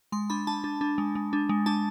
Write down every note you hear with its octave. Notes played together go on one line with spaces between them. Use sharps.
G#3 C6
D4 B5
D4 A5
D4
D4
G#3
G#3
D4
G#3
D4 A5